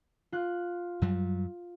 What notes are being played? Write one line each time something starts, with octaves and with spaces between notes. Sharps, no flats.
F4 F#6
F#2 F#3 G3